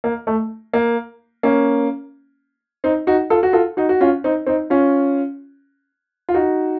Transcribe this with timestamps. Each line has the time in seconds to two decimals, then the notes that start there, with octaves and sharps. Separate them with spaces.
0.04 A#3
0.27 A3
0.74 A#3
1.43 A#3 C#4
2.84 C4 D#4
3.07 D#4 F#4
3.30 F4 A4
3.43 F#4
3.53 F4 A4
3.77 D#4 F#4
3.89 F#4
4.01 C#4 F4
4.24 C4 D#4
4.46 C4 D#4
4.70 C#4 F4
6.29 F4
6.34 D#4 F#4